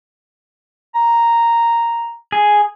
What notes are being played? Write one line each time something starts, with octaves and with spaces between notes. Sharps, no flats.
A#5
G#4